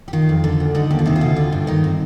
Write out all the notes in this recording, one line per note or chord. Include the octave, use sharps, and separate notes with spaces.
G4
D#3 F4
F2
D3
D2
D3 D#4
D#2 G4
F4
C3 D#4
F4
D2
D3
G2
D#3 D#4
C4